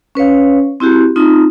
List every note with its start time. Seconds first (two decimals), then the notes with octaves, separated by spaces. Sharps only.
0.15 C#4 B4 C#5 F5
0.80 C4 E4 F#4 G4
1.16 C4 D#4 F4